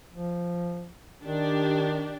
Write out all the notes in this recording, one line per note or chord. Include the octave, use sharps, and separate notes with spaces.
F3
D#3 D4 G4